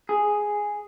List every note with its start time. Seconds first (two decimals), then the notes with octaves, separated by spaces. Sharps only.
0.09 G#4